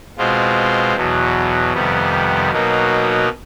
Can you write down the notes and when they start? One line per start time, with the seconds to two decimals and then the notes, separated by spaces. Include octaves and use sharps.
0.18 B2 G#3 C4 F4
0.95 E2 B2 F#3
1.74 F2 C3 D#3 G3 B3
2.51 B2 F#3 A#3 D#4